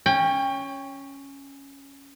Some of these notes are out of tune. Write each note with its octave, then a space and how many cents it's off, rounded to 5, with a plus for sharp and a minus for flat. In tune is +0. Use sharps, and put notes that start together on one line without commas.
C#4 +0 G5 +30